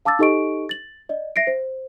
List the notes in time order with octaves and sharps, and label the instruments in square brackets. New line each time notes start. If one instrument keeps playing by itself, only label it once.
[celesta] F5 A5 D6 E6 A6
D#4 G4 A4 D#5 C#6 D7
A6 F#7
D5 D#5
E5 A#6 C7 D7
C5